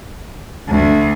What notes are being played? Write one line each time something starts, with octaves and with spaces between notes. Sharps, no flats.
D2